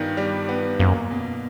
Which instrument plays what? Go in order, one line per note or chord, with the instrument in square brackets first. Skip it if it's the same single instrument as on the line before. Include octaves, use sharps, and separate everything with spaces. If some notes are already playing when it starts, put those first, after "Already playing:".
Already playing: [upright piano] G2 D#3 B3
G3
B3
[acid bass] F#2 [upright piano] A#3
[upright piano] B2